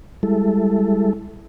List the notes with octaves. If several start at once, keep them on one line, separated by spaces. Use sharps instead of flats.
G3 G#3 E4 A4